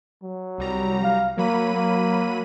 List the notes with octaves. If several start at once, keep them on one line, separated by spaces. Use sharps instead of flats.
F#3
C2 G3 A#5
F5
F#3 A#3 B5 D#7
A#3